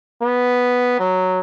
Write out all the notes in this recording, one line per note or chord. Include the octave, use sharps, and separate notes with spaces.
B3
F#3